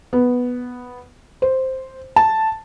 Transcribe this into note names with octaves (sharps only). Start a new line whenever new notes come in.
B3
C5
A5